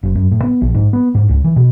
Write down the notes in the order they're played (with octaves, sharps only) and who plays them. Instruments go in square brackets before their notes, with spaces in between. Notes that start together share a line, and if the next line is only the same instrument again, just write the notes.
[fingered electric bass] F#1
F#2
A2
B3
A#1
G#2
B3
G#2
C#2
E3
B2